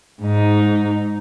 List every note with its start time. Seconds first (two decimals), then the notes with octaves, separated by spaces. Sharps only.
0.22 G#2 D#4